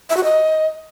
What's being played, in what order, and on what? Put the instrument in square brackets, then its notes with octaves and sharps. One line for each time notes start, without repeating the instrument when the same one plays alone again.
[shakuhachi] E5
F#4
D#5